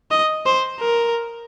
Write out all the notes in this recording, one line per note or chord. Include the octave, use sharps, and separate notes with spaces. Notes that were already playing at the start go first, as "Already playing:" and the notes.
D#5
C5
A#4